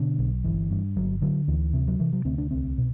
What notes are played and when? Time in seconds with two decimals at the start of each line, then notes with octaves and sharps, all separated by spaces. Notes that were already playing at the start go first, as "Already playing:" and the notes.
Already playing: B2 D3
0.19 B1
0.44 G1 E3
0.71 G2
0.97 G1 F#3
1.22 D3 F#3
1.48 D2 E3
1.73 C3
1.88 F#3
1.99 C3 E3
2.13 F#3
2.25 D2 C4
2.38 D4
2.51 C2 C4
2.78 B2